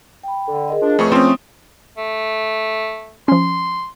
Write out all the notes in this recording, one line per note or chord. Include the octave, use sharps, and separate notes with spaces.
G5 B5
D3
G#4 A#4 D#5
F3 D4
F2 G#2 C#3 A3 G#4 B4 C#6
F3 C4 C#4 C#6 D#6
A3
F3 C#4 C6